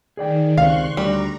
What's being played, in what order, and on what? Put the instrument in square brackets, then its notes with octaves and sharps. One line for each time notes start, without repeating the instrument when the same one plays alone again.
[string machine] D#3 [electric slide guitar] G#4 D5 G5
[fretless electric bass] C#2 C3 C4 [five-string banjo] F5 [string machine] C6 C#6 F#6
[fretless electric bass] D2 [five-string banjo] G3 [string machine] A#5